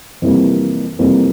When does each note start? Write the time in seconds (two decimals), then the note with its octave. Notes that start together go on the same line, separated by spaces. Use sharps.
0.22 F2 C3 E3 G3 A#3
0.99 F2 C3 E3 G3 A#3